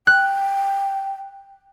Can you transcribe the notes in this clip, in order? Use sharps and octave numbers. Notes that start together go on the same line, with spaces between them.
G5 F#6